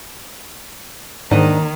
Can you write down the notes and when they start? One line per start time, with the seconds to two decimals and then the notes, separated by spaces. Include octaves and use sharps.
1.31 D#2 G#2 D#3 D4 D#5